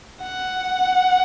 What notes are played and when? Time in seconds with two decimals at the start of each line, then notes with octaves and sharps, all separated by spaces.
0.22 F#5